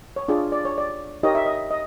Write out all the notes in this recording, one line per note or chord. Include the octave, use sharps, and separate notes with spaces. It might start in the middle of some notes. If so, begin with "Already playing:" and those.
C#5
D4 F4 G#4 D5
D5
C#5
D5
D#4 G4 A#4 C#5 D#5
E5
D#5
D#5